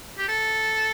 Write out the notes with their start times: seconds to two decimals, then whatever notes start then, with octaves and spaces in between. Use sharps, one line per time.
0.18 G4
0.28 A4